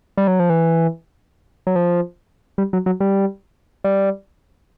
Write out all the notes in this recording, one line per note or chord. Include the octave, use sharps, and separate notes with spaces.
G3
F#3
F3
E3
F#3
F3
G3
F#3
F#3
G3
G3